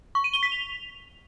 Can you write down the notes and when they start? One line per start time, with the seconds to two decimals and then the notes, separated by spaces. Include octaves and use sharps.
0.15 C#6
0.24 D#7
0.33 G7
0.43 B6
0.52 F7